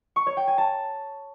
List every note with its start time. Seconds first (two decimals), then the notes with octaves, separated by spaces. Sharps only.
0.16 C#6
0.27 C#5
0.37 G5
0.47 G#5
0.58 A5